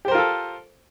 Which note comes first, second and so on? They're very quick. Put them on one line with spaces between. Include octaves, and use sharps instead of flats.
G4 C5 A#4 F4 A4